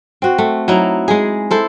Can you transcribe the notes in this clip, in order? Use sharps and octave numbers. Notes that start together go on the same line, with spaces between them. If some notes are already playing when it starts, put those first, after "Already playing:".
C4 F#4
A3
F#3 D#4 E4
G#3 G#4
E4 A4 C5